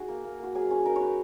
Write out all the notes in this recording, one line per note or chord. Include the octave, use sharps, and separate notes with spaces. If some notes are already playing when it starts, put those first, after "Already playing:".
Already playing: D#4 F#4 G#4
A#3
A#3
A#3 F#4
F#3 G#4
C#4 G#4
D#4 A#4
C#5
D#4 B4